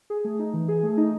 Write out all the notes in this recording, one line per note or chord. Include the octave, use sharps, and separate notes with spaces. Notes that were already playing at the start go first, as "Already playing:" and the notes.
G#4
A3
D#4
E3
G#4
A3
D#4